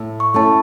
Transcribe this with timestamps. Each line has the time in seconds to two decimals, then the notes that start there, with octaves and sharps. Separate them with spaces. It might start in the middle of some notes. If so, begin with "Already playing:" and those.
Already playing: A2
0.20 C#6
0.34 A3 C#4 E4 A5